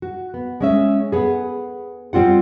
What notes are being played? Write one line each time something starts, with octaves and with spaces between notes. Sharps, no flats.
F#4
B3
G#3 C#4 E5
B3 G#4
G3 C4 F4 F#5